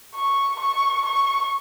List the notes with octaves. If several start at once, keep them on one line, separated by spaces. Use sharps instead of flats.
C#6
C#6
C#6